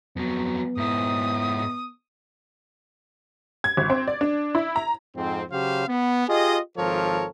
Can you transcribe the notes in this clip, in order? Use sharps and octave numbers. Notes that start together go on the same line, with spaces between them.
F2 F#3 B3
G#2 E4 D#6
G#6
G#1
C4
D5
D4
E4
A#5
F2 G#2 C4
C#3 F#3 G4 C5 F5
B3
F4 G4 G#4 D#5
G#1 F3 A4 A#4 C#5